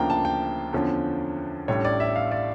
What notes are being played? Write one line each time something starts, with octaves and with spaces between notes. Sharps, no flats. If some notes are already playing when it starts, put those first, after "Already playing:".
Already playing: D2 C#3 F3 A#3 D4 G5 A#5
A5
G5
E2 D3 F3 C#4
A1 A2 G3 D4 C#5
D5
E5
F5
D5